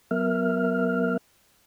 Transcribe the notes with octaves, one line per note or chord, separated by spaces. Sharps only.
F#3 B3 A#4 E5 F6